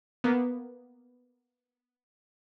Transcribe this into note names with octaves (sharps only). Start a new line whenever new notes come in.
A#3 B3